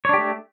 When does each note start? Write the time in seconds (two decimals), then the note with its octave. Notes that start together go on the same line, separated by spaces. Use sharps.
0.05 C#5
0.09 D4
0.14 G4
0.18 A3